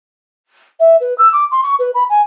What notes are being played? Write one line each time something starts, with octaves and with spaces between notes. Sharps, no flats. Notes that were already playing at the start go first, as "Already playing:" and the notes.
E5
B4
E6
D6
C6
C#6
B4
B5
G#5